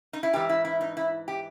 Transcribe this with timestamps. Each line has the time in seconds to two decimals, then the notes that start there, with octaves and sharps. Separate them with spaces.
0.13 D#4
0.23 E4
0.33 G#2 E3 G4
0.49 E4
0.65 E4
0.81 D#4
0.97 E4
1.28 G4